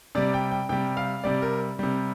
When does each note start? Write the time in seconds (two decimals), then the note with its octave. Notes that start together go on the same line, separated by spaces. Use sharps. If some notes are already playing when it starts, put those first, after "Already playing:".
0.15 C3 G3 D5
0.34 G5
0.51 G5
0.69 C3 G3 G5
0.97 F5
1.24 C3 G3 D5
1.42 A#4
1.79 C3 G3